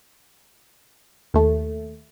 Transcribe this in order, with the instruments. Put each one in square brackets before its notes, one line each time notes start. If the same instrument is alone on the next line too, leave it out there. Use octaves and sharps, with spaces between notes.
[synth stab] D#2 A3